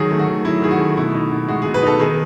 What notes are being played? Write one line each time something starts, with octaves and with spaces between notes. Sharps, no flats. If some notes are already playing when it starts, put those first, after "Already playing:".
Already playing: D#3 F#3 G#4
A3
F#4
D#3
F#3 E4
D#3 G#4
F#4
A3
B2 E4
D#4
B2
G#3 F#4
B2 G#4
B4
D#4 A4
D#3 G#4